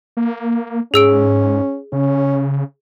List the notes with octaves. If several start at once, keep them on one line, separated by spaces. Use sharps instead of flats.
A#3
G#2 C#4 G#4 E6 D7
C#3 C#4